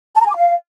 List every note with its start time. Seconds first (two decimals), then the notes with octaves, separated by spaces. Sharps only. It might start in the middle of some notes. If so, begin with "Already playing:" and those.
0.15 A5
0.20 A#5
0.26 G#5
0.31 D6
0.36 F5